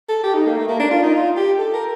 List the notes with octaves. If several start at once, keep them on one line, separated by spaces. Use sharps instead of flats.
A4
G4
D#4
A#3
A3
A#3
D4
F4
D#4
F4
G4
A4
A#4